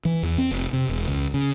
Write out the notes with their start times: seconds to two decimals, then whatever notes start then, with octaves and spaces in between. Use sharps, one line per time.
0.05 E3
0.23 E2
0.38 C4
0.51 F1
0.73 C3
0.89 E1
1.08 C#2
1.34 C#3